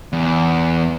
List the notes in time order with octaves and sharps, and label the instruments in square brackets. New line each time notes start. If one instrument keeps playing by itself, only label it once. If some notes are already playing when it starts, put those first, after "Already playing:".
[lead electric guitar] E2